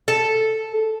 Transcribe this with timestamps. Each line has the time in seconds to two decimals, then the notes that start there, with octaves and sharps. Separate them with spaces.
0.08 A4